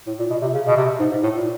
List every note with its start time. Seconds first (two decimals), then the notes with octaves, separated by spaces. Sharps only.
0.07 A2
0.19 A#2
0.30 B2
0.42 C3
0.54 C#3
0.66 B2
0.76 C3
1.00 G#2
1.11 G#2
1.23 A2
1.35 A#2